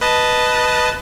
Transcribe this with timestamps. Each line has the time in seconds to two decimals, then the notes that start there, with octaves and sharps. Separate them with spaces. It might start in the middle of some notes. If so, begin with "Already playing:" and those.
0.01 B4 D#5 A5